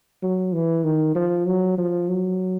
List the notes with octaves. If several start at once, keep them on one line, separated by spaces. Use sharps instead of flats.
F#3
E3
D#3
F3
F#3
F3
F#3